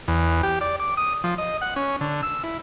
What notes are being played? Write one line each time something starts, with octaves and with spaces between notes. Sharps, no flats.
E2
G4
D5
D6
D#6
F3
D#5
F#5
C#4
D3
E6
E4